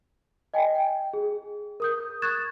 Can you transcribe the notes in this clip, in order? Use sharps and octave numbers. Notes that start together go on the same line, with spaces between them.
D#5 G5 G#5
G5
G#4
A#4 D#6 G6
C#6 D#6 F#6 G#6 A6 E7